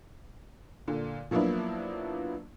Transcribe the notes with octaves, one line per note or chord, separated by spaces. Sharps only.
A#2 D3
F3 F#3 A#3 B3 D4 E4